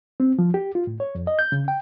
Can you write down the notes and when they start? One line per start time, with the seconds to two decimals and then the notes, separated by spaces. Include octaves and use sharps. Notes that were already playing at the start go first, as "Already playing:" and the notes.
0.20 C4
0.39 F3
0.54 G4
0.75 F4
0.87 A2
1.00 C#5
1.15 F2
1.27 D#5
1.39 G6
1.52 C#3
1.68 G5